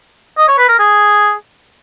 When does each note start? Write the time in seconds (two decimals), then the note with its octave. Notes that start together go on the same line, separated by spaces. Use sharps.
0.38 D#5
0.48 C#5
0.58 B4
0.69 A#4
0.79 G#4